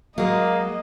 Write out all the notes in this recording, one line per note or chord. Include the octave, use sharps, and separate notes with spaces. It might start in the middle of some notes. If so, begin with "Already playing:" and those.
F#3 G#3 A#3 D#5